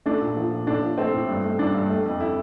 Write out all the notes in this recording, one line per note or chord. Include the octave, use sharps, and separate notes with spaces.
A3 D4
A#2
F3
A#2
A2 D4
F3
A3 C4
A2
G2
A3
G2 D4
G2
A3
F2
E4